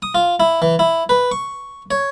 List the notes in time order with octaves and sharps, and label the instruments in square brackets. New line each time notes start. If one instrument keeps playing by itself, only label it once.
[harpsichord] D#6
F4
E4
E3
E4
B4
C#6
C#5